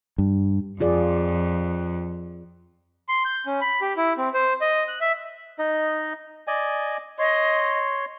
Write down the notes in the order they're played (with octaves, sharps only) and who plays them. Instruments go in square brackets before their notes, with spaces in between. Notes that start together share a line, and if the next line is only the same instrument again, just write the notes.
[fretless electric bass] G2
[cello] F2 [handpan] F4 G#4 D5
[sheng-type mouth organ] C6
G6
C#4
B5
G4
E4
C4
C5
D#5
F#6
E5
[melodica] D#4 D#5
D5 D#5 G#5
[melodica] C#5 C6 [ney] D#5